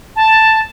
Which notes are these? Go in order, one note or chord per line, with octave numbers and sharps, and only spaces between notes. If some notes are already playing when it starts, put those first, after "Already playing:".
A5